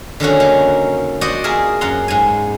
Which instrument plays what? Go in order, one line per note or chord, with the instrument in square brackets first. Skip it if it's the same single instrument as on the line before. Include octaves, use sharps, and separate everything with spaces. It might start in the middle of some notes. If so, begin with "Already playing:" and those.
[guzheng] D3 D#3 C#4 F#4
A#3
F#4 C5 D5 D#5 F#5
F4 G#4 A#4 E5
F#2 F#5 A#5 C6
G#2 G#5